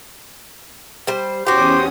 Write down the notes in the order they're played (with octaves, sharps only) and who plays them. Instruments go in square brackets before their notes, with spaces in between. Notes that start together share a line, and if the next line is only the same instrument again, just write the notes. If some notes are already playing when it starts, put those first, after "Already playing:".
[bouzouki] G3 C5
[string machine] E2 C#4 D#6 [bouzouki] F#4 G4 [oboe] C5 [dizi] D6